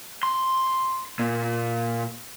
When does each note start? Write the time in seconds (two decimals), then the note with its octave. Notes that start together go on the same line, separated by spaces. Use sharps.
0.23 C6
1.19 A#2